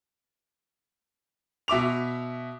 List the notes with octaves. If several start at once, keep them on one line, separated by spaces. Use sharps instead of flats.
B2 E5 D6 F7